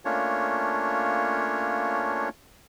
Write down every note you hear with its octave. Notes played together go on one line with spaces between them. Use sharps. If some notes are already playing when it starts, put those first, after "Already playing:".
A3 A#3 C#4 D4 F4 C#5